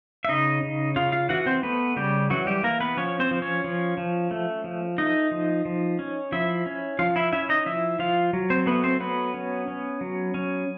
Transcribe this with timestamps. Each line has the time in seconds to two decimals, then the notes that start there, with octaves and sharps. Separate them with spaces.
0.25 E5
0.29 C#3 D#4 D#5
0.63 C#3
0.96 C#3 F4 F5
1.12 F4 F5
1.29 E3 F#4 F#5
1.46 C4 C5
1.63 A3 B3 B4
1.96 C#3 G3 G4
2.30 E3 F#3 F#4
2.47 G3 G4
2.63 E3 A#3 A#4
2.80 B3 B4
2.97 F3 C#4 C#5
3.20 C4 C5
3.31 F3
3.42 C#4 C#5
3.64 F3
3.98 F3
4.31 A3
4.64 F3
4.98 A3 D#4 D#5
5.31 F3
5.65 F3
5.99 C#4
6.32 F3 E4 E5
6.66 C#4
6.99 F3 F4 F5
7.16 E4 E5
7.33 C#4 E4 E5
7.49 D#4 D#5
7.66 F3 E4 E5
7.99 F3 F4 F5
8.33 F#3
8.50 C4 C5
8.66 A3 B3 B4
8.83 C4 C5
9.00 F#3 B3 B4
9.34 C#4
9.68 C#4
10.01 F#3
10.34 C#4